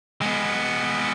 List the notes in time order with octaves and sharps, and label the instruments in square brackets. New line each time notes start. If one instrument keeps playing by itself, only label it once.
[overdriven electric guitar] G#3 B3